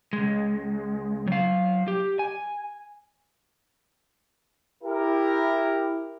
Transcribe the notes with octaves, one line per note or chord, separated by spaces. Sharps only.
C#2 G#3
F#3 F5
G4
G#5
E4 G4 A#4